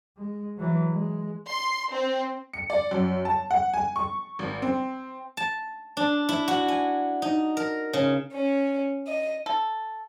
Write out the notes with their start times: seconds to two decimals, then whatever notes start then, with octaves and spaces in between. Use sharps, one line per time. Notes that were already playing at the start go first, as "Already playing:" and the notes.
0.17 G#3
0.57 E3 F#3
0.90 G#3
1.49 C6
1.92 C4
2.53 C#7
2.70 D5
2.91 F#2
3.25 A5
3.51 F#5
3.74 G#5
3.96 C#6
4.39 G#1
4.62 C4
5.37 A5
5.97 D4
6.29 E4
6.48 F#4
6.68 G#5
7.22 D#4
7.57 A#4
7.93 C#3
8.33 C#4
9.07 D#5
9.46 A4